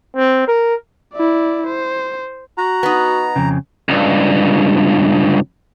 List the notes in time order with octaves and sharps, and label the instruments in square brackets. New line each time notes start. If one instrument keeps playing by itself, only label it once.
[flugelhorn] C4
A#4
[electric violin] E4 D5
C5
[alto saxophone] F#4 [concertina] A#5
[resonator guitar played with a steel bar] B3 D#4
[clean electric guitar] F2 C#3
[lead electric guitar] C#2 G2